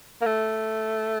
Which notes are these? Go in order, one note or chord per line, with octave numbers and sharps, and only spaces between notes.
A#3
A3